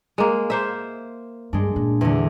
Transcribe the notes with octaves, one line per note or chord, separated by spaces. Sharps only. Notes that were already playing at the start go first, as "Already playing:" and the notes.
G#3 A#3
A#3 C5 E5
G2 G#3 D4
A#2
E2 D3